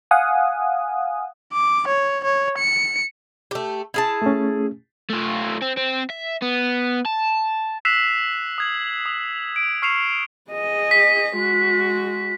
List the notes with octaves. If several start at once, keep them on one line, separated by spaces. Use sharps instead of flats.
F5 F#5 G#5 D#6
D6
C#5
C#5
C#7
A3 G4
E4 G#4 A5
A3 C#4
A3 F4
C4
C4
E5
B3
A5
E6 F#6 B6 C7 E7 F7
D#6 G#6 F#7
D#6
D7
C#6 F6 C7 C#7 E7 F7
G#4 D#5
B6
G#3 F#4